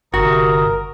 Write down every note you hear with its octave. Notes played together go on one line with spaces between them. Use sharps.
G1 C3 F#4 A#4 A#5 D#6